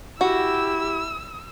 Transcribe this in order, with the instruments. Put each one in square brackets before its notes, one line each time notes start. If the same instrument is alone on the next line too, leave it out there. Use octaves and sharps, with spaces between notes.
[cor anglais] E4 [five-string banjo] F#4 [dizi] G4 [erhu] E6